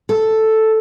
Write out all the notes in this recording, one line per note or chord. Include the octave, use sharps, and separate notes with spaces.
A4